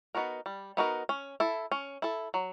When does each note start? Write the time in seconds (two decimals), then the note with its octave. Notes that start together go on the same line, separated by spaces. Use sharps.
0.15 B3 D#4 F#4 A#4
0.46 G3
0.77 B3 D#4 F#4 A#4
1.09 C#4
1.40 E4 A4
1.72 C#4
2.02 E4 A4
2.34 F#3